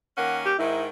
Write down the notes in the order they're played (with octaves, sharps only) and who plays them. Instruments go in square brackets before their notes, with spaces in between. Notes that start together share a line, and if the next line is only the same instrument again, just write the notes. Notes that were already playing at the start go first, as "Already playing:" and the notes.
[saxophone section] D#3 A#3 C#4 [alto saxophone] F#5
[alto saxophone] G4
[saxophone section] G#2 D#3 [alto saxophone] E4